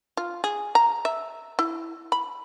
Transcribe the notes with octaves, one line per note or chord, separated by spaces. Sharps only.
F4
G#4
A#5
E5
E4
B5